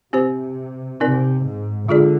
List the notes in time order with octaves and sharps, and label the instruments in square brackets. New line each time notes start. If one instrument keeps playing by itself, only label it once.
[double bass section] C3 [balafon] C4 G4 C5
[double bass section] C3 [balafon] C4 D#4 A#4 D5
[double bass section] G#2
[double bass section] D3 [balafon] G#3 D4 F4 G#4 D5